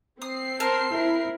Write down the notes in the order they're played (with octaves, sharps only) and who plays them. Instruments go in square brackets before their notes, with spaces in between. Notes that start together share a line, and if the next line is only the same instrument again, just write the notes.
[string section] C4 C7 [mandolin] D#6
[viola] A#4 C5 [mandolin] A5 F6
[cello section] E4 [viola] A#4